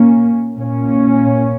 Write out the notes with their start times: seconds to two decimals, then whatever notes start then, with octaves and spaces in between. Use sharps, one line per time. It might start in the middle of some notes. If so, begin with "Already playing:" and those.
Already playing: A#2 A#3 C#4
0.56 A#2 A#3 C#4